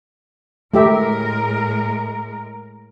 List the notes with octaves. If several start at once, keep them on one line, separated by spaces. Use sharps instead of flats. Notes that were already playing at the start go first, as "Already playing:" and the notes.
A2 G#3 A3 G4 A#4 E5